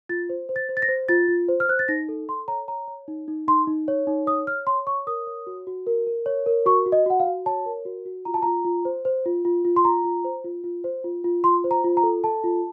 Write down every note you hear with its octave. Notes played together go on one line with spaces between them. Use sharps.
F4 A6
C5
C5
A6
C5
A6
A#6
C5
F4 A6
F4
C5
F6
C5 F#6
A6
D#4 A#6
A4
A4 C6
C#5 A#5
C#5 A#5
C#5
D#4
D#4
D#4 C6
D#4
C#5
D#4
C#5 D#6
C#5 F6
C#5 C6
C#5 C#6
A#4 D#6
C#5
F#4
F#4
A#4
A#4
C#5
A#4
F#4 C#6
F#4
D#5
F#4 F#5
F5
F#4
C#5 A5
A#4
F#4
F#4
F4 A#5
A5
F4 A#5
F4
C5
C5
F4
F4
F4
C6
F4 A#5
F4
C5
F4
F4
C5
F4
F4
F4 C6
C5
A#5
F4
A#5
A4
A4 A5
F4